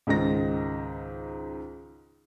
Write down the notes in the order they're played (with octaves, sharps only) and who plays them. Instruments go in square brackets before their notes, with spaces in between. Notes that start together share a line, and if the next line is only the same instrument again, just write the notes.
[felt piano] C#2 G#2 D#3 A#6